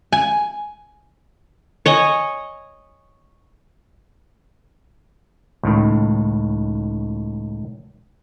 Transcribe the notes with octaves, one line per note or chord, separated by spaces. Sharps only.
G#5
C#5 D#5 G#5
C#2 A2 D#3